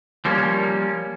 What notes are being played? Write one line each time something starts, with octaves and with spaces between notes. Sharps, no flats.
F3 G3 A#3 C#4